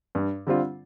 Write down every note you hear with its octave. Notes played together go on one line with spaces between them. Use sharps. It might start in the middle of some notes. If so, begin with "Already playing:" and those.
G2
D3 G3 C4 F4